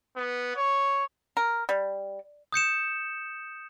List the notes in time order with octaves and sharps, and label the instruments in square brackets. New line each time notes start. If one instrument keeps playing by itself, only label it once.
[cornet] B3
C#5
[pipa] A#4
G3
[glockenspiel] D#6 G6 C#7 E7